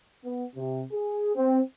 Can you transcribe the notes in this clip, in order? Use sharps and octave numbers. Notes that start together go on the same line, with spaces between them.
B3
C3
G#4
C4